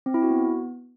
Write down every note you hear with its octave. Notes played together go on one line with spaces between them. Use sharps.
C4
E4
F#4
B3